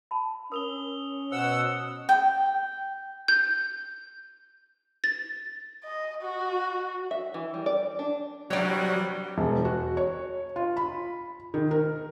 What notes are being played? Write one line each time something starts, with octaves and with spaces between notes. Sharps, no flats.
A5 B5
C#4 A#4 D#6 F7 G7
B2 C5 F#5 E6
G5
G6
A6
D#5
F#4
E5
E3
G3
D5
D4
G2 C3 F#3 G3 C#5 D5
E1
F#4
C#5
F4
B5
D#3
A#4